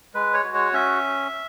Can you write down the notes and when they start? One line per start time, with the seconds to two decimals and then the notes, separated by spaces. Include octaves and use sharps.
0.14 G#3 B4
0.34 C#5
0.44 F#4
0.54 C#5
0.73 C#4 E5